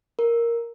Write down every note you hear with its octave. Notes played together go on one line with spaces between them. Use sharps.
A#4